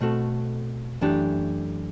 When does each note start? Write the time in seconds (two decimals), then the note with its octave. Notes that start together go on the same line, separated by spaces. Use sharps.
0.01 B2 A3 C4 F#4 A4
1.01 F#2 E3 A3 D4 G4